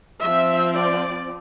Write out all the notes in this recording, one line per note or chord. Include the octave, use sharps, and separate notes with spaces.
F3 E5
C4
D5